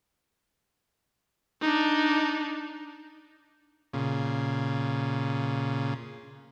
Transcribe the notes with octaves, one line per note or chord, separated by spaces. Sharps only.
D4 D#4
A#2 C#3